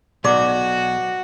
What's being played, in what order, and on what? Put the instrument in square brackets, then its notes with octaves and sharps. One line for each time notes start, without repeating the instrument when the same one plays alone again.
[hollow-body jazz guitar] B1 [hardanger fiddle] F#4 [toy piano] D5 D6